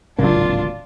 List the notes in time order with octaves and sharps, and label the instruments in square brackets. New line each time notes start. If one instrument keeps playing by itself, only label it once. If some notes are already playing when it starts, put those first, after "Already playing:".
[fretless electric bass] D1 G#1 A#3 [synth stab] C#3 F#3 [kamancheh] D4 F4